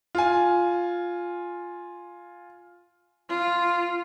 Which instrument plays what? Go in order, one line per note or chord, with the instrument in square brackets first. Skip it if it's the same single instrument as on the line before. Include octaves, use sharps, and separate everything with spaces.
[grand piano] F4 G#5
[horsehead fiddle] F4